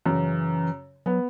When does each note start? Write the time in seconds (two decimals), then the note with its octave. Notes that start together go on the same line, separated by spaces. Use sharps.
0.06 F#2 C#3 E3
1.06 F#3 B3